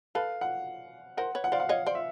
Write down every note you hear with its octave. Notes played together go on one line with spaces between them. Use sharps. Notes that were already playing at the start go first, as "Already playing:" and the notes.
A4 B4 F5
F#5
A#4 C5 F#5
B4 C#5
F#5
C5 D5 F5
F#5
C#5 D#5 F5
C5 D5
E5